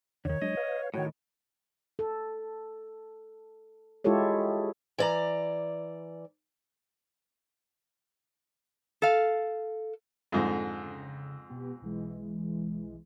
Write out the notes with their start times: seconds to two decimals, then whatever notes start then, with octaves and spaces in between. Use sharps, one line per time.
0.25 E2 D3 D#3 C#5
0.42 F#3 G#3 D4 D#5
0.57 B4 F5
0.94 A2 D#3 F#4 C#5 F#5 G5
1.99 A4
4.04 G#3 E4 F4 G4 A4 C#5
4.98 E3 D5 A#5
9.02 A4 F5
10.32 F2 G#2 D3
10.85 C#3
11.49 B2 B3 G4
11.81 B1 E3 G#3